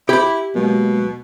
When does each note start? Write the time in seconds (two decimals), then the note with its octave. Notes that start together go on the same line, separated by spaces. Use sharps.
0.09 E4 G4 B5
0.55 B2 F#3 G#3 A#3